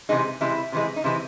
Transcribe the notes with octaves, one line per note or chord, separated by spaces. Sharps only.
C3 E3 G#3 D#4
C3 E3 G#3 E4
C3 E3 G#3
D#4
C3 E3 G#3 E4